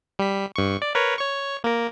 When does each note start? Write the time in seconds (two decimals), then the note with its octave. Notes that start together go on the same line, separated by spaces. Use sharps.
0.19 G3 B6
0.56 G2 C#6
0.82 D5
0.95 A#4 B4 C#5
1.18 C#5 C#6
1.64 A#3 A#4